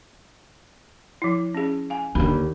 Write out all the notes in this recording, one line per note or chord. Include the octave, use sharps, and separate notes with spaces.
F3 E4
C#4 G#4
F5 G#5
D#2 D3 B5